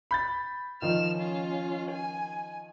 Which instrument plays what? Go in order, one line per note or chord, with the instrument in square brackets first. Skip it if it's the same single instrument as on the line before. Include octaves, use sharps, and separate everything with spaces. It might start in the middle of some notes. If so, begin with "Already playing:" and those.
[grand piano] B5 G6 A6
[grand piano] D#3 F3 D#5 [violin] F6 E7
[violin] C#4 F4
G#5